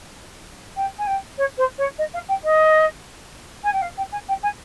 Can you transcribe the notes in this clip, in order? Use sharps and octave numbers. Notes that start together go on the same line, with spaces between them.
G5
G#5
G5
C#5
C5
C#5
D#5
F5
G5
D#5
G#5
G5
F5
G5
G#5
G5
G#5